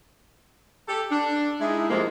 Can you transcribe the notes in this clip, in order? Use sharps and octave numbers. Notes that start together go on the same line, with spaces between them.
G4 A4
D4
G#3 D#4 E4
A2 C3 F3 G#3 A#3